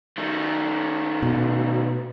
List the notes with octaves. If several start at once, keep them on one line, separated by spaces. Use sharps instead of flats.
D#3 A3
B2